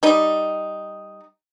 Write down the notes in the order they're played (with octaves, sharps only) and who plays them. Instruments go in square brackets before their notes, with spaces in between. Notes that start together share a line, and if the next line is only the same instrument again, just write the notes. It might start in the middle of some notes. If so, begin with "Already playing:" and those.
[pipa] G3 D#4